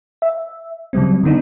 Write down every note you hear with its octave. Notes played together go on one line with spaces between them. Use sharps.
E5
C#3 F#3 G3 C4
D3 D#3 B3 D4 D#4